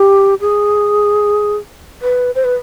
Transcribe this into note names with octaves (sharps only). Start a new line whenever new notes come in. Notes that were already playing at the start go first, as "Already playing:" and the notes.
Already playing: G4
G#4
B4
C5
B4